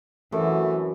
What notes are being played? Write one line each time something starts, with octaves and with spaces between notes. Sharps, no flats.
F#2 C3 E3 A3